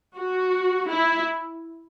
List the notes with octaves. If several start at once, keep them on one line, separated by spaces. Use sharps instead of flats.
F#4
E4